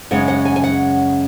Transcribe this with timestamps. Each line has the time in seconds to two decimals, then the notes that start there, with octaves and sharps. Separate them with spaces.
0.11 F#2 C#3 G#3 C#4 F#5
0.28 F#5
0.45 G#5
0.56 G#5
0.64 F#5